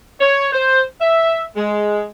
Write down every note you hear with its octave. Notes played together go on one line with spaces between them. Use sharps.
C#5
C5
E5
G#3